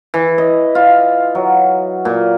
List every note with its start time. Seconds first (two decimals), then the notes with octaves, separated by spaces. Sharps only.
0.14 E3
0.38 D#5
0.75 F4
1.35 F#3
2.05 A#2